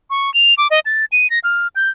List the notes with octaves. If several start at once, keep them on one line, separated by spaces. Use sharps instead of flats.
C#6
F7
D6
D#5
A6
D#7
A#6
F6
G6